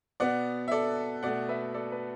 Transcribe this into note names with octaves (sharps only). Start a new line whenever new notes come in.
B2 B3 D5 F#5
E5
A4 D5
B2 A3 D5 F#5
B4 E5
A4 D5
B4